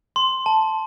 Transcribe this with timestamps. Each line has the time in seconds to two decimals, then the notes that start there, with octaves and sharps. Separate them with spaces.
0.16 C6
0.46 A5